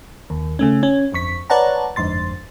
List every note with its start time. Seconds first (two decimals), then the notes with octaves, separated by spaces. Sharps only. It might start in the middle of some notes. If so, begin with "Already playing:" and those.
0.30 D#2
0.59 C#3 A3 C#4
0.83 C#4
1.12 G1 F2 C#6 B6
1.50 B4 C#5 D5 F#5 A5 A#5
1.96 G1 F2 G#2 C6 A6